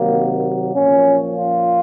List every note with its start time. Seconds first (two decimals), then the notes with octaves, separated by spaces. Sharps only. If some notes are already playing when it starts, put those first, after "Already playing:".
Already playing: C3 D#3 F#3 A#3
0.73 A#2 F3 C#4
1.34 F4